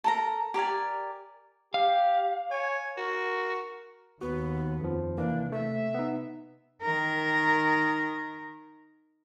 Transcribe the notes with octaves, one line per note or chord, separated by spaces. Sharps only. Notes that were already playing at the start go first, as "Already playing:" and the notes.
A4 A#4 A#5
G4 A#4 D5 G#5
G4 F5
C#5 G#5
F#4 A#4
D#2 B3 F#4
F2 F3
C3 E3 A#3 D4
A3 E5
B3 D#4
D#3 A#4